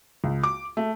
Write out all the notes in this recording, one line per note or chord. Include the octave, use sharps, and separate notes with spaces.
C#2
D6
A3